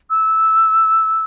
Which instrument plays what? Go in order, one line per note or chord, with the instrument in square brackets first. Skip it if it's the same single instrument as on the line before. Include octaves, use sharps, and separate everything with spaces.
[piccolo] E6